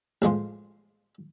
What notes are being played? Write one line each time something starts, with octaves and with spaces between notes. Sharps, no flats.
A1 F3 G#3 C6